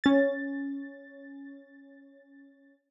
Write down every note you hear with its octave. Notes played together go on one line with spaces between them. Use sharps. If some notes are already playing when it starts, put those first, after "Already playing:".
C#4 A6